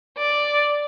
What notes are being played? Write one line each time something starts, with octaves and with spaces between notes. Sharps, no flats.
D5